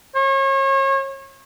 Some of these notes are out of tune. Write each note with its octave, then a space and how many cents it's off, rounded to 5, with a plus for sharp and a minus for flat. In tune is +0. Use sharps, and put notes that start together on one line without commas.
C#5 -35